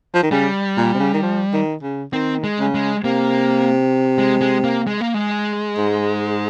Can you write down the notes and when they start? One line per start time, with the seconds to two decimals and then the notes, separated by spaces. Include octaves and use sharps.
0.14 F3
0.23 D#3
0.31 C#3 G3
0.77 A#2
0.94 C3
1.00 C#3
1.14 D#3
1.22 F3
1.53 D#3
1.83 C#3
2.13 D#3 C4
2.44 G#3
2.59 C#3
2.74 G#3
3.04 C3 A#3
4.18 G#3
4.41 G#3
4.64 A#3
4.87 G#3
5.01 A#3
5.14 G#3
5.77 G#2